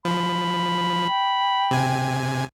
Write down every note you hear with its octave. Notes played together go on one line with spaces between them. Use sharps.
F3 B5
G5
C3 G#5